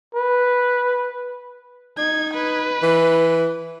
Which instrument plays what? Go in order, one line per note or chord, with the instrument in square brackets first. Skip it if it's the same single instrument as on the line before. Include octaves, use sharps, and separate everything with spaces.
[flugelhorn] B4
[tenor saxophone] D#4 [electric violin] G#6
[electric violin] B4
[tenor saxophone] E3